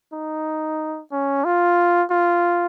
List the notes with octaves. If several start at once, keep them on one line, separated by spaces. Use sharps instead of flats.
D#4
C#4
F4
F4